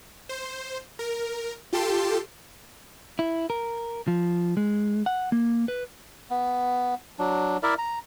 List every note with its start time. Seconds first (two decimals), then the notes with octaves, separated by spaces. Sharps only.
0.29 C5
0.99 A#4
1.73 F4 G4 A4 G5 A5 C6
3.19 E4
3.50 A#4
4.08 F3
4.57 G#3
5.06 F#5
5.32 A#3
5.68 B4
6.30 B3
7.19 F#3 D4
7.63 E4 A#4 D5 E5
7.78 A#5